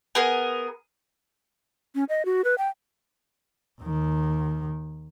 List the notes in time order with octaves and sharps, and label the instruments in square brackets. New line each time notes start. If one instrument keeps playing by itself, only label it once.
[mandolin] B3 G#4 A#4
[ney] C#4
D#5
F#4
B4
G5
[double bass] D#2 D#3